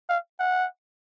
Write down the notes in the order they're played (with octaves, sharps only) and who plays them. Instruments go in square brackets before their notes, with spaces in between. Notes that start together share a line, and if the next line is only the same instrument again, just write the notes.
[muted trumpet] F5
F#5